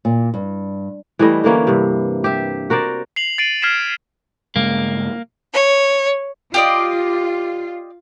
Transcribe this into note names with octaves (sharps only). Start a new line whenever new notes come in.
A#2
G2
E3 G3 A3 D#5
D3 E3 A#3 C#4
G2 C3
G4 E5
F#4 A#4 C5 D5
C7 F7 F#7
A6 C7 D7 D#7 F#7
F6 G#6 B6 C7 E7
G2 C#3 G#3 A#3
C#5
F4 G4 D5 D#5